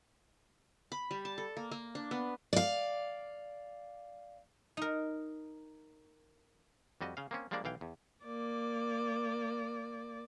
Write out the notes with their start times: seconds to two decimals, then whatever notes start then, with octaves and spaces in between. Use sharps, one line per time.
0.92 B5
1.11 G3
1.25 A5
1.38 A4
1.57 A#3
1.71 A#3
1.95 D4
2.11 B3
2.53 D5 F5
4.77 D#4 A#4
7.01 F2 G3 F#4 D#5
7.17 C#3 F5
7.31 A#3 C4 C#4
7.51 F3 G3 G#3 A#3 D4 D5
7.64 B1 E3 F5 G5
7.81 E2
8.25 A#3 D5